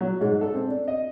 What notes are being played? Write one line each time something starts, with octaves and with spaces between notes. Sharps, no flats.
F#3
G#2
A4
C4
D4
D#5